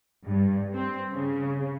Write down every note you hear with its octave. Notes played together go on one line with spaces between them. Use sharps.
G2
C4
C#3